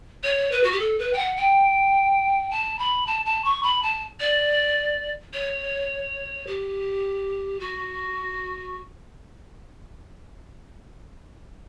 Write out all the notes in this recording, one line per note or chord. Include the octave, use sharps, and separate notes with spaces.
C#5
B4
F#4
G4
A4
B4
G5
F#5
G5
A5
B5
A5
A5
C#6
B5
A5
D5
C#5
G4
F#4